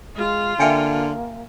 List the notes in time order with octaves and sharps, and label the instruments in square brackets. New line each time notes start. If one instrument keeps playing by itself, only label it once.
[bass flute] G#3 [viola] F4
[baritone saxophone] D3 [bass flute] A#3 [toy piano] E5 G5 G#5